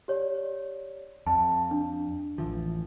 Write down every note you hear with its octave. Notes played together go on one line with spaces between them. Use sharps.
G4 C#5 D5
F2 A5
D4
A1 E3 F3